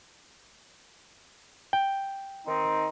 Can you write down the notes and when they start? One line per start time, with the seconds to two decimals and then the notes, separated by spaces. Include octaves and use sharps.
1.73 G5
2.47 D#3 C4 D#4